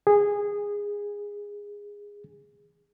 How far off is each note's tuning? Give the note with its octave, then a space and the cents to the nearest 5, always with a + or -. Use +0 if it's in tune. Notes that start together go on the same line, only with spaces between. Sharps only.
G#4 -15